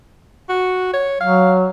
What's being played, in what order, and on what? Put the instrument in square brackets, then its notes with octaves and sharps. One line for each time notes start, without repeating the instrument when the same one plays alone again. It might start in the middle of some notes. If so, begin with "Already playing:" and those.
[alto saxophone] F#4
C#5
[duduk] F#3 [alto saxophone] F5